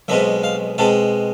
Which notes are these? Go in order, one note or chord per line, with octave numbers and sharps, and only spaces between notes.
B1 B2 G#3 C4 E5
F5
B2 G#3 C4 A5